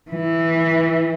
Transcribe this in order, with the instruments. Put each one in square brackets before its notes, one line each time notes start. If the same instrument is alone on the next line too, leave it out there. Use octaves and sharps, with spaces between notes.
[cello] E3